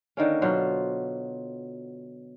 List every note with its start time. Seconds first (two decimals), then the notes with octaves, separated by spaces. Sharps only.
0.17 D3 D#3 A#3 C#4
0.42 B2 F#3 F4 C5